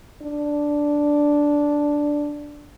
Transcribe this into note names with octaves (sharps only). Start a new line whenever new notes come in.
D4